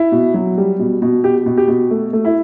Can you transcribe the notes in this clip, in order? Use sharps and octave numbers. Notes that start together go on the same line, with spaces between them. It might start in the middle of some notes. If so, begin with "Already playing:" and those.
Already playing: E4
B2
F#3
G3
B2
B2
B2 G4
B2
G4
B2
A3
A3
E4